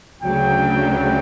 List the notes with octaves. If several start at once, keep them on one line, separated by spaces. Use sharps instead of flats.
D2 C#3 F#3 G5